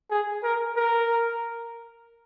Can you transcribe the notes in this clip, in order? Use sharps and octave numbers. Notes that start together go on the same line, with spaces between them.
G#4
A#4
A#4